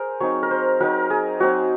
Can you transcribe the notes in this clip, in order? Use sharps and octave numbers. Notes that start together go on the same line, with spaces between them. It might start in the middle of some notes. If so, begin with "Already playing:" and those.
Already playing: G#4 A#4 C5
F#3 C4 D#4 C#5
A#4
C5
F#3 C4 D#4 A#4
G#4
F#3 C4 D#4 F#4